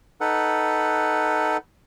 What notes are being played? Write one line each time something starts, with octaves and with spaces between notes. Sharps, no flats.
D#4 A4 B4 F#5